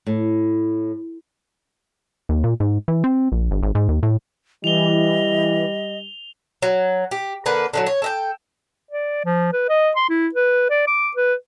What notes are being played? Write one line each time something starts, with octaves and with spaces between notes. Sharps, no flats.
A2
D#2
A#2
G#2
E3
C4
A#1
G1
G#1
G#2
D#2
A2
E3 G3 D#5 F7 G7
F#3
G4
D3 A#3 B4 F#5
D3 D#3 F#3
C#5
A4 D#5 G5
D5
F3
B4
D#5
C6
E4
B4
D5
D6
B4